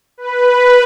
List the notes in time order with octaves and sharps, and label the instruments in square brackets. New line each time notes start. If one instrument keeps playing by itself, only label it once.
[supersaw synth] B4